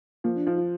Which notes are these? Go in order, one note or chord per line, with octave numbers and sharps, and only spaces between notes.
F3 A#3
D4
F3 D#4
F4